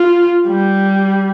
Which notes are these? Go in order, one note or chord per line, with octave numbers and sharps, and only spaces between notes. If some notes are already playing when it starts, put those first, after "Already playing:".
Already playing: F4
G3